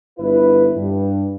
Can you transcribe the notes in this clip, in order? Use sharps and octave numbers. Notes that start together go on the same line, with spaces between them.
G1 E4 B4
G2